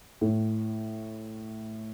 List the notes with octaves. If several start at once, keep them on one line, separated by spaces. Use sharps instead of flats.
A2